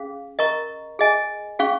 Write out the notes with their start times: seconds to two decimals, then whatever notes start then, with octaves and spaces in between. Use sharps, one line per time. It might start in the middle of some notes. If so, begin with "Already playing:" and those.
Already playing: C#4 G#4 F5
0.39 A#4 D#5 A#5 C#6
0.99 G#4 D#5 G#5
1.59 C#4 G#4 F5 C#6